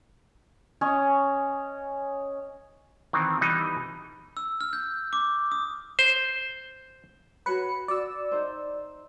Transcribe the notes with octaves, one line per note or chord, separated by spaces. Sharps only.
C#4 C#5 D#5
D#3 E3 C4
E3 G3 B3 D#4
E6
F6
G6
D6
D#6
C5
F#4 B4 C#5 B5 C#7
F#4 D5 E6
D#4 C5